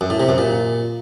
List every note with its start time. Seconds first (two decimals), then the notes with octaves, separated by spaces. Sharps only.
0.01 F#2
0.10 A2
0.20 C3
0.29 F#2
0.38 A#2